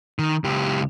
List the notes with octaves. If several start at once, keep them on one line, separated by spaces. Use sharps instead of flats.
D#3
C#2 G4